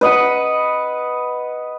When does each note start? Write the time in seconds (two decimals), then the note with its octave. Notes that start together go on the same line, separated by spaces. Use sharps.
0.01 B4 D#5 F#5 B5